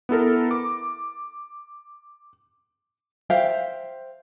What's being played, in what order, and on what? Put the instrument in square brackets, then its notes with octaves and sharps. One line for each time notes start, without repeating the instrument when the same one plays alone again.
[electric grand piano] B3 E4 A4 A#4
D6
[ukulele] C5 E5 F5 G5